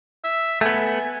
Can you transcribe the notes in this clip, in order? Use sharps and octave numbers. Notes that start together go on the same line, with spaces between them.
E5
A3 B3 G#5